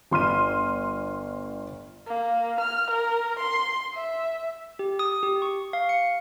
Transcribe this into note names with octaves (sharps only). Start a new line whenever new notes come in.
G1 C6 F6 D#7
A#3
F6
A#4
C6
E5
G4
D#6
G4
C#6
F5
C#7